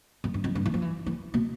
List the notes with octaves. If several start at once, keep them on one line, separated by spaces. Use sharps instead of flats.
F2
G2
F2
G2
E3
F3
E3
E3
B2